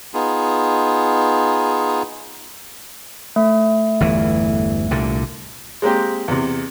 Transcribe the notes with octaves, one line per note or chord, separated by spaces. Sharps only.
B3 D#4 F4 G#4
A3
G1 E2 E3
C2 A#2 D3
G#3 A#3 C4 G4
E2 C3